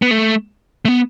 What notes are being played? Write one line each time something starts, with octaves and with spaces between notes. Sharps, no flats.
B3
A3
A3
B3